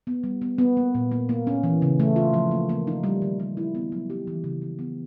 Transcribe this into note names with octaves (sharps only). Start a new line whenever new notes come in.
B3
G3
B3
B3
A#3
A#2
A#3
A#3
C#4
E3
C#3
A3
F4
F3
A#3
A#3
D#4
G3
D#3
G3
E4
B3
F#3
G4
E3
C#3
C#3
B3